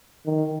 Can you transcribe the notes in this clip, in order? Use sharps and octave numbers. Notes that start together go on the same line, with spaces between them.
D#3